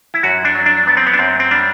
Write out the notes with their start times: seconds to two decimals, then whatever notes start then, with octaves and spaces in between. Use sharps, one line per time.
0.14 E4
0.23 F#2 F#4
0.45 D4
0.55 F#3
0.66 D4
0.87 F#3 B3
0.97 C4
1.07 B3
1.14 D4
1.19 F#2 C4
1.40 C4
1.51 G3 D4